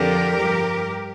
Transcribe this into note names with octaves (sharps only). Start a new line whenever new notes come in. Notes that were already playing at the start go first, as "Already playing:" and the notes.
Already playing: F2 D3 F3 G4 A#4
G2 F3